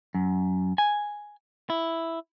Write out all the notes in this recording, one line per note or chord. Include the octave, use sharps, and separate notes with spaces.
F#2
G#5
E4